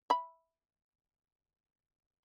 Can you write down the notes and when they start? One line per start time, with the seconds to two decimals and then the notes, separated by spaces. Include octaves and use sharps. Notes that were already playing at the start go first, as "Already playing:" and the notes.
0.10 E5 B5